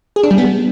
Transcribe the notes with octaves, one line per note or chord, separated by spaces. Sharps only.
G#4
D4
G3
B3